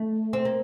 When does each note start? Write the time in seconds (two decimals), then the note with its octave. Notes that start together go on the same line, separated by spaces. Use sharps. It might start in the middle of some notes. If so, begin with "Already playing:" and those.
Already playing: A3
0.33 C4
0.45 A#3